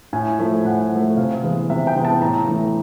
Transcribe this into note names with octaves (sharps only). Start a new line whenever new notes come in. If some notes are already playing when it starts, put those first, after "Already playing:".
A2 G#5
F3 A3
A2 F#5
F3 A3
C3 F5
E3 G#3 B3
C3 E5
G5
E3 G#3 B3
A5
A2 A#5
E3 A3